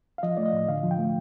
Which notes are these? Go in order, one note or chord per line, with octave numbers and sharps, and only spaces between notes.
F5
F3 D#5
A3 D5
D#5
A2
D3 F5
F3
G5
A3